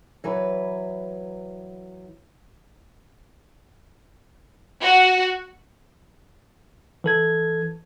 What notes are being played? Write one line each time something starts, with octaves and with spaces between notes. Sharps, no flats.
E3 F#3 B4
F#4
E3 A4 G#6